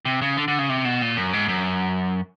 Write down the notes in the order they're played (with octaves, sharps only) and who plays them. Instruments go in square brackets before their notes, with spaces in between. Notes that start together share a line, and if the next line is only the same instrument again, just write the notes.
[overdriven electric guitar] C3
C#3
D3
D3
C#3
C3
B2
A#2
F#2
G#2
F#2